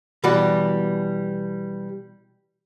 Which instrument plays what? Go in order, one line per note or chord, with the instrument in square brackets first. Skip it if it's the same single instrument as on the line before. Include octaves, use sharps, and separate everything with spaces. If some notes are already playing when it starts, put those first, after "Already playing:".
[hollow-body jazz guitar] B2 E3 G3 F#4 D5